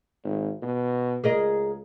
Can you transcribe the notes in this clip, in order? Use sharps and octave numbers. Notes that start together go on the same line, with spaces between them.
G#1
B2
C#2 G#4 A#4 D#5